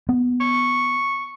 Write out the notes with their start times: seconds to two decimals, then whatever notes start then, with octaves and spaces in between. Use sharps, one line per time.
0.09 B3
0.40 C#6